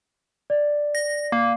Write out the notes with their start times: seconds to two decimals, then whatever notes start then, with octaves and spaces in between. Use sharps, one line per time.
0.50 D5
0.95 A#6
1.32 A#3